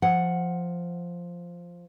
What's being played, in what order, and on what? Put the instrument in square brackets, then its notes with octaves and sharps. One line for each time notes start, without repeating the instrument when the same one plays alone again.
[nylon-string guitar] F3 F#5